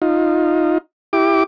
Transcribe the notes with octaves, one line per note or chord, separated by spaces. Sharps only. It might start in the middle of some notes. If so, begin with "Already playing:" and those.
D#4 F4
E4 G4 D6